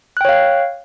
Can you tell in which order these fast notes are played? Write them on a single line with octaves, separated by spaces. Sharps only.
F#6 G5 C#5 F5